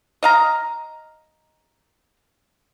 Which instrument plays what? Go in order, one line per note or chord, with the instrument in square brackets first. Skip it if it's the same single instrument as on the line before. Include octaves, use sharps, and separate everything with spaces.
[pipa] D#5 F5 A#5